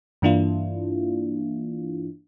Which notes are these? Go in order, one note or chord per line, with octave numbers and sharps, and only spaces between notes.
G2 E3 A#3 D4 E4 F4